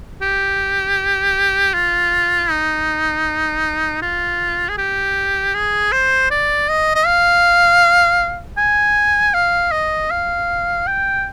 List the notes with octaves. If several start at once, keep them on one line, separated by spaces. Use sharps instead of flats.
G4
F4
D#4
F4
G#4
G4
G#4
C5
D5
D#5
D#5
F5
G#5
F5
D#5
F5
G5